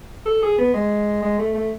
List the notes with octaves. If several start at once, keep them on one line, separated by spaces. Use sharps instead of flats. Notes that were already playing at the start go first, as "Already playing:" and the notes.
A4
G#4
B3
G#3
G#3
A3
A3